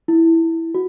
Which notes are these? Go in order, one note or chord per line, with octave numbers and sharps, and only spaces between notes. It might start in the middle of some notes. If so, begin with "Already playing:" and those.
E4
F#4